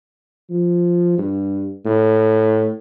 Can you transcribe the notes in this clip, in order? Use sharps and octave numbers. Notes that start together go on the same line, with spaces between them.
F3
G2
A2